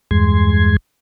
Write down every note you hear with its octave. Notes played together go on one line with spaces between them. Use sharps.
E2 G2 G#3 C6 G#6